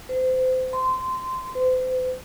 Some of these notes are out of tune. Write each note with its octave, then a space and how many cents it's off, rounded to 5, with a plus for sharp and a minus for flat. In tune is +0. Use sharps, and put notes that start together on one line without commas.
C5 -30
C6 -15
C5 -40